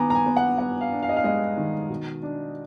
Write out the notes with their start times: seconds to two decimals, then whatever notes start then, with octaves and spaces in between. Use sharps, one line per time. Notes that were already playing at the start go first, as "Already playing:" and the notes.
Already playing: D#3 B3 G#5 A#5 D6
0.10 A#5
0.15 G#5
0.26 B3
0.37 F#5
0.58 B3 F#5
0.81 F5
0.92 D4
1.02 F5
1.09 D#5
1.16 F5
1.24 G#3 D#5
1.57 D#3
1.89 B2
2.23 D4